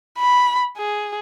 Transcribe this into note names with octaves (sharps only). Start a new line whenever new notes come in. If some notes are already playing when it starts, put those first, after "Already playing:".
B5
G#4